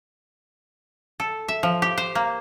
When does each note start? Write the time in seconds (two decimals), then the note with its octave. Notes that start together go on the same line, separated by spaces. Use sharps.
1.20 A4
1.48 E5
1.63 F3
1.82 G4
1.98 C5
2.15 A#3